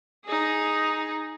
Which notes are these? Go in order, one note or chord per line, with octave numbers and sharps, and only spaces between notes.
D#4 G#4